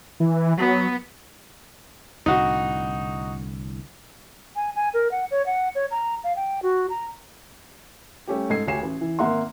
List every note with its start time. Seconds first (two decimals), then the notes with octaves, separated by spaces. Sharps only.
0.20 E3
0.58 F#3 B3
2.26 C2 A2 D3 D#4 F#4
4.56 G#5
4.76 G#5
4.94 A#4
5.11 F#5
5.31 C#5
5.46 F#5
5.75 C#5
5.91 A#5
6.24 F5
6.36 G5
6.63 F#4
6.90 A#5
8.27 G3 A3 C#4 G4
8.50 G#2 A4 D#5 G#6 C7
8.67 D2 G4 C#5 G#5 C7 E7
8.82 A1
9.01 E3
9.19 G#1 A#3 E5 F#5 C6